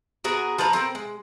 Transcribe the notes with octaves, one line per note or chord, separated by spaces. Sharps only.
B3 F#4 G#4 A#4
F3 A4 B4 A#5
C4 A4 A#4
G#3